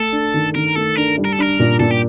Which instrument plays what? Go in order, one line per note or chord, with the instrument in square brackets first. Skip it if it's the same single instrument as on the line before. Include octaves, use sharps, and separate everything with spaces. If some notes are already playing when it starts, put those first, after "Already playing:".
Already playing: [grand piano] A3 [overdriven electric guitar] A4
[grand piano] D4
D#3
[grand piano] D#3 [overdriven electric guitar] A#4
[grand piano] A3 [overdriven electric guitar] A4
[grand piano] D4 [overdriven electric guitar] A#4
[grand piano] G3
[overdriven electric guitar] A#4
A4
[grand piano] D4 [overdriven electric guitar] A#4
[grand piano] A#2
[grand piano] A#2 [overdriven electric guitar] A4
[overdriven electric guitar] G4